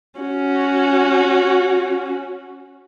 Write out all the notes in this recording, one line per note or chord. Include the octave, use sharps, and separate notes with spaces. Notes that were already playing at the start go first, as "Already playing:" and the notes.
C#4 F#4